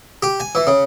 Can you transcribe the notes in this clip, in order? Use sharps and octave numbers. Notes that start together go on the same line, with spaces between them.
G4
G#5
E3
C#3